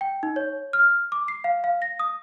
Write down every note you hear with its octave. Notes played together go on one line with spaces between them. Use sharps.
G5
D#4
C#5
F6
D6
C7
F5
F5
A#6
D#6